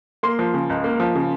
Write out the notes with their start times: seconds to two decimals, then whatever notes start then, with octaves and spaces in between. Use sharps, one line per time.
0.23 A#3 C6
0.39 F3
0.54 C#3
0.70 C#2
0.84 A#3
1.00 F3
1.15 C#3